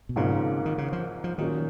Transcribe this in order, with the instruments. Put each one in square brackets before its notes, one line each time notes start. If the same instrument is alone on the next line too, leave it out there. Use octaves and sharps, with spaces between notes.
[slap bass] B2
[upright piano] G#1 G#2 F3 A#3 [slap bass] C#3
[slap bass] D#3
C#3
F3
F3
[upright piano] A#2 F#3 C#4 F#4 [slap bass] D#3